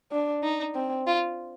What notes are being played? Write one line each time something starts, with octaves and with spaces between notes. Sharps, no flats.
D4
D#4
C4
F4